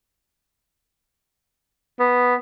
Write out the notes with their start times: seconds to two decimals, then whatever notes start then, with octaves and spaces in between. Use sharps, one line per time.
2.00 B3